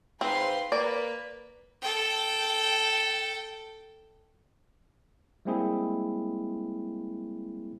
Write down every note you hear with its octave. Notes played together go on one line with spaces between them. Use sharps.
G#2 C4 B4 F5 C6
A#3 B4 D5
A4 G5
G3 G#3 A#3 C4 E4 G#4